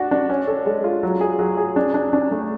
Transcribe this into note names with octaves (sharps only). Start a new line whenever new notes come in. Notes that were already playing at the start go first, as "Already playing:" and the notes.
Already playing: D4 F#4
D4
C#4
A4
G#3
F4
F#3
G#4
F#3
G#4
D4
D4
D4
A3